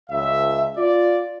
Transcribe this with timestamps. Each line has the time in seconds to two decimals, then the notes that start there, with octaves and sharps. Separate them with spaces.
0.10 C#2 E5
0.77 F4 D5